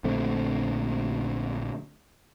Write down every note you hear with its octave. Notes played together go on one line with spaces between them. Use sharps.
A#1 D3 A3 C4